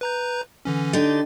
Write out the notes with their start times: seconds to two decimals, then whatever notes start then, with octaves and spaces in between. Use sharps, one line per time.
0.01 B4 A#5 G6
0.65 D3 E3 C#4
0.93 D3 D#4 G4 A6